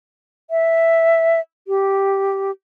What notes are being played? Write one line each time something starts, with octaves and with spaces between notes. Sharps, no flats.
E5
G4